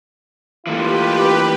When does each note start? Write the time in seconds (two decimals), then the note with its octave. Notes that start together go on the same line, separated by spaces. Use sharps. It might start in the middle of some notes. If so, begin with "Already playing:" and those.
0.67 E3 A3 A#3 F4 G4 B4